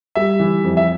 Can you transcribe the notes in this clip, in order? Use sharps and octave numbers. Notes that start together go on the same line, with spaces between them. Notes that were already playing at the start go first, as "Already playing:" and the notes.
G3 E5
E3
F2
E5